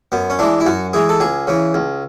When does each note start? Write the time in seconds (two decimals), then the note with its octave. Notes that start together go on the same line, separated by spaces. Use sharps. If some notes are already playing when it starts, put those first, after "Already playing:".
0.12 F#2 B3
0.30 C#4
0.39 E3 G#3 D4
0.60 E4
0.66 F#2 F#4
0.93 E3 G#3 G#4
1.09 A4
1.20 C#2 G#4
1.47 C#3 E3
1.74 C#2